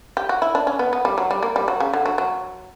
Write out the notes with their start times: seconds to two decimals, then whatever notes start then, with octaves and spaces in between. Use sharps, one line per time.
0.17 G4
0.29 F#4
0.42 E4
0.55 D4
0.67 C#4
0.79 B3
0.93 B3
1.05 G3
1.18 F#3
1.31 G3
1.43 A#3
1.56 G3
1.68 F#3
1.80 C#3
1.93 D3
2.06 F#3
2.18 F#3